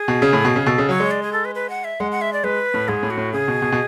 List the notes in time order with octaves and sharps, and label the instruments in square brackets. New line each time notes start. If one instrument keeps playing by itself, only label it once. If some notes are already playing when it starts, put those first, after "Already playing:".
Already playing: [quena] G#4
[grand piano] B2
C#3
A2
B2
C#3
[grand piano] B2 [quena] A4
[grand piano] C#3
[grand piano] F#3 [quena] C#5
[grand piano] G#3
[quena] D5
G#4
A4
B4
B4
F#5
E5
[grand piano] G#3 [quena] F#5
[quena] F#5
E5
D5
[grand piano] G#3 [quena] B4
[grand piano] A2
[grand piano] G#2 [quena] G#4
[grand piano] A2
[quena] F#4
[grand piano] A2
[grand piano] C#3 [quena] G#4
[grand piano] B2
B2
B2